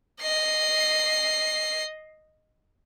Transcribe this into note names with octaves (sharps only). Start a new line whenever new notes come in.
D#5 C7